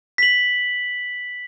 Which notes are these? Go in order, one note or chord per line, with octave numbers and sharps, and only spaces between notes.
B6 F#7